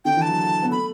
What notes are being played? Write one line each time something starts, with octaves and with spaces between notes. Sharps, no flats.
D3 G5
E3
A5
F#3
B3
A3 B5